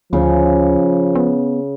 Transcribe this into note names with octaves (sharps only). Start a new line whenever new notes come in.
D2 C#3 F3
B3